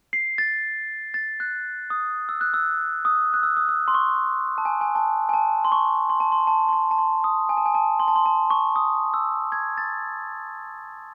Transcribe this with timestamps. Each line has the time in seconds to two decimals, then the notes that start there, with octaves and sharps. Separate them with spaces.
0.13 C7
0.38 A6
1.14 A6
1.40 F#6
1.90 D#6
2.29 E6
2.41 F#6
2.54 E6
3.05 D#6
3.34 F#6
3.43 E6
3.57 D#6
3.69 E6
3.88 C6
3.94 C#6
4.58 A5
4.65 G#5
4.81 G#5
4.95 A5
5.29 G#5
5.34 A5
5.65 C6
5.72 C#6
6.10 C6
6.20 A5
6.32 C6
6.47 A5
6.69 C6
6.73 A5
6.91 A5
6.98 C6
7.24 D#6
7.49 G#5
7.57 A5
7.66 G#5
7.75 A5
8.00 C6
8.08 A5
8.16 C6
8.26 A5
8.50 C#6
8.76 D#6
9.14 E6
9.52 G#6
9.78 A6